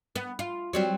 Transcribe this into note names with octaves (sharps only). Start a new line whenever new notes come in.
B3
F4
F#3 G3 C4